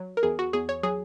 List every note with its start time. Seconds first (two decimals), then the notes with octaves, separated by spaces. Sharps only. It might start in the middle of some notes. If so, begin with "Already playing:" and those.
Already playing: F#3
0.17 A#4
0.23 E2 G#4
0.39 F#4
0.53 E2 G#4
0.69 C#5
0.83 F#3 G#4